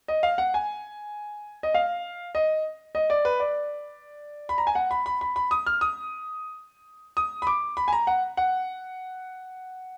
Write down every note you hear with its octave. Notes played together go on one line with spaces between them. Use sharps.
D#5
F5
F#5
G#5
D#5
F5
D#5
D#5
D5
B4
D5
B5
A#5
G#5
F#5
B5
B5
B5
B5
D#6
F6
D#6
D#6
B5
D6
B5
G#5
A#5
F#5
F#5